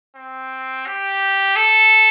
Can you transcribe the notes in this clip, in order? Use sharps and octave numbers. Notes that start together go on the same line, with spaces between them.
C4
G4
A4